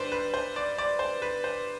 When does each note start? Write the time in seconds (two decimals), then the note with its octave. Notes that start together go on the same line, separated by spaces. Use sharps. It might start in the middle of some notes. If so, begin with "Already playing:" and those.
Already playing: G2 D3 G3 B4 C5 D5
0.12 B4
0.34 C5
0.56 D5
0.78 D5
0.99 C5
1.22 B4
1.44 C5